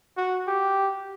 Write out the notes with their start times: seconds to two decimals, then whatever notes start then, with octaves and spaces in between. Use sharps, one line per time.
0.17 F#4
0.48 G4